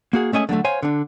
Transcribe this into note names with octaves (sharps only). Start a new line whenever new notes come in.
A#3 F#4 G#4
G#3 A3 C#4 D#5 G#5
D3 F#3 G#3 A3
C5 C#5 F5 F#5 G#5
D3 D4